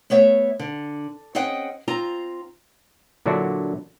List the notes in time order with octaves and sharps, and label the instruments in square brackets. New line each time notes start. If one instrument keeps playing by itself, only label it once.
[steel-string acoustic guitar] A3 B3 C#5 E5
D3
C4 C#4 G#4 D#5 F#5 G5
C4 F4 A#5
[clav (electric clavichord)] A#2 D3 F#3 D4 E4 F#4